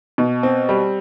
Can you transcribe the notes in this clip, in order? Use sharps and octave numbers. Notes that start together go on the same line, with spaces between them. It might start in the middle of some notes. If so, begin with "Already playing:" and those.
B2
C4
G3